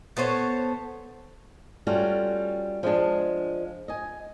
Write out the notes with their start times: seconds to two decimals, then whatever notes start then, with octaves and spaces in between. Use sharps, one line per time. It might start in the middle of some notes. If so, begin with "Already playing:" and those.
0.17 B3 A4 C5 C#5
1.87 G3 A3 C#4 F4 F#4
2.83 F3 G#3 D4
3.88 D#5 G#5